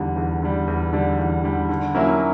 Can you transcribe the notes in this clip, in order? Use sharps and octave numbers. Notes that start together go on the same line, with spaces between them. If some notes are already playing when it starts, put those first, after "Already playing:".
Already playing: E2 D3 G3
E2
D3 G3
E2
D3 G3
E2
D3 G3
D3
F#3 A#3 C#4 E4